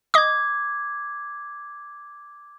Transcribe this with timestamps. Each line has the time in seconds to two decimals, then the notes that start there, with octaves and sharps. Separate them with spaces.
0.14 D#5 D6 D#6 G#6